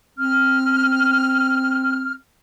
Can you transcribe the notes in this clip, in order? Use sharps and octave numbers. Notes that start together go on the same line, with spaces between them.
C4 F6